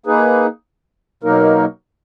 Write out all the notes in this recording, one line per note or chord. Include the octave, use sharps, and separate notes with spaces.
A#3 D#4 G#4 B4
B2 F#3 A#3 D#4 A#4